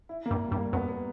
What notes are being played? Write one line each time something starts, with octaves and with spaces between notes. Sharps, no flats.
E4
A#3
G2
G2 G3
A#3
F#2 B3
B3